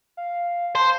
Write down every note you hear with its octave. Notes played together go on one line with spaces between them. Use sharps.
F5
C5 A5